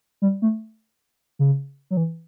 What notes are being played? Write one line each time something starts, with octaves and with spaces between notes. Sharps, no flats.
G3
A3
C#3
F#3
E3